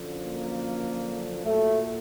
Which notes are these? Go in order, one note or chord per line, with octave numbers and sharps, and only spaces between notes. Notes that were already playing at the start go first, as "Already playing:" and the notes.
Already playing: F#2 D3 F3
A#3
A#2 F#3 A3